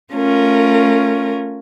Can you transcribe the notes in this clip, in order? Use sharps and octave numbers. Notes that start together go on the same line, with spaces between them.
A3 C#4 F4 A#4